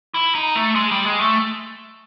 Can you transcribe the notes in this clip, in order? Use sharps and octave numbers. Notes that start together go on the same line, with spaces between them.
E4
D#4
A3
G#3
G3
G#3
A3